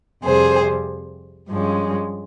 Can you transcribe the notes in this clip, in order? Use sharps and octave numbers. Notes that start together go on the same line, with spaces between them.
F2 C3 G3 G#4 C5
G2 F3 G#3 C#4